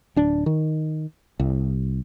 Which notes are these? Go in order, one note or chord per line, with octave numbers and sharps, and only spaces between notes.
D1 D4
D#3
C2